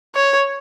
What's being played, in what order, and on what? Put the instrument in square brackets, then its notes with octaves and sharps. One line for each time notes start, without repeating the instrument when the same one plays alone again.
[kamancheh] C#5